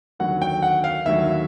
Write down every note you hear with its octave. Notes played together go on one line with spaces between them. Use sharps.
D#2 D3 F#3 F#5
G5
F#5
F5
D#2 D3 F#3 E5